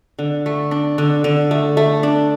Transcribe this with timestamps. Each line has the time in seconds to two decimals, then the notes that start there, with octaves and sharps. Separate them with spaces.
0.19 D3
0.46 A3
0.71 D4
0.98 D3
1.24 D3
1.51 A3
1.77 A3
2.03 D4